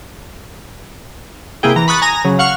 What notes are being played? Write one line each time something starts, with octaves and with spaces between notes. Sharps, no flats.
C3 A#3 E4 G#4 G5
E3 A#5
B5 C#6 D#6 F#6 A6
G#5 A#5 D#6 A#6
C#3 F#3
F5 F#5 C#6 F6